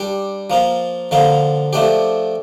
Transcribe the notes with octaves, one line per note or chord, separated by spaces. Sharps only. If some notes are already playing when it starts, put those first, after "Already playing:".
Already playing: G3 D4 G4
F3 A#3 F4
D3 F3 A#3 F4
F3 A3 D4 G4